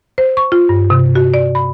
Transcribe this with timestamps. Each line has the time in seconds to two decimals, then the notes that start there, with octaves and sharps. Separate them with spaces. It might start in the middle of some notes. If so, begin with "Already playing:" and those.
0.18 C5
0.37 C#6
0.52 F4
0.69 G2
0.90 C3
1.15 F#4
1.34 D5
1.55 B5